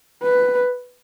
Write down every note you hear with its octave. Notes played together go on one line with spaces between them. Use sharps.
B4